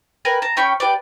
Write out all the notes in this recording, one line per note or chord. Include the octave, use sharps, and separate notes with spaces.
A#4 B4 G5 G#5
A5 A#5
C#4 G5 B5 C#6
G4 B4 D5